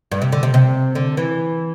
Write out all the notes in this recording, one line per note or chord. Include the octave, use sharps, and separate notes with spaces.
G2
C3
D3
C3
C3
D3
E3